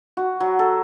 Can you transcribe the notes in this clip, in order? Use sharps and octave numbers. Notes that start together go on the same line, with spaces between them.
F#4
F#3
A4